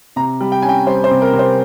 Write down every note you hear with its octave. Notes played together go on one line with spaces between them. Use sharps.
C3 A#5
G3
G5
C#4 G#5
G5
G3 C5
C5
C3
A#4
C3
C5